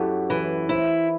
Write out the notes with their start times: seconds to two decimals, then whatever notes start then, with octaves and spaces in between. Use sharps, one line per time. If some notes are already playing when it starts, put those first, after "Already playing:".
Already playing: F#2 E4 F#4 G4 A4
0.30 E3 B4
0.69 E4 C5